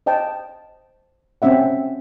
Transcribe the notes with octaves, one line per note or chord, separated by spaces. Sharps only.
C5 D#5 G5 A5
C4 C#4 E5 F#5